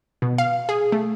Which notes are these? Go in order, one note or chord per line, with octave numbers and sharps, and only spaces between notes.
B2
F5
G#4
A3